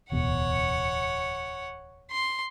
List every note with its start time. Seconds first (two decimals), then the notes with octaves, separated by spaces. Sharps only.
0.12 D1 E2 B2 C#5 F#5
2.12 C6